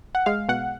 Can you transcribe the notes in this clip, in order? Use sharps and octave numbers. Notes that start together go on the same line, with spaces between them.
F#5
G#3 F5
B2 F#5